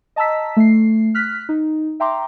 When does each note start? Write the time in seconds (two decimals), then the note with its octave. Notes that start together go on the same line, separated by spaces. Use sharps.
0.16 D#5 A5 A#5 E6 B6
0.57 A3 C7
1.15 F6 F#6 B6
1.49 D#4
2.00 E5 G5 A#5 C6 D6